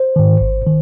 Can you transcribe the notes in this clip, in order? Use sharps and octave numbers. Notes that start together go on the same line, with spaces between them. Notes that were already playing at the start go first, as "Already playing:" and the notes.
Already playing: C5
G#2 D#3
G#1
D#3